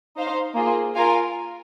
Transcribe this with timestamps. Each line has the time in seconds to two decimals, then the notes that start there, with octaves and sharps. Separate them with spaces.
0.16 D#4 C5 F5
0.55 A#3 F4 G#4
0.95 F4 A#4 F5 G#5